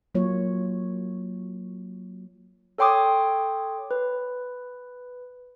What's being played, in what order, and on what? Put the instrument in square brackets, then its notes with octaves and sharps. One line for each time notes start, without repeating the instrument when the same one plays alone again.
[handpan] F#3 A#3 F4 C#5
[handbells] A4 C#5 G5 C6 D6 D#6
B4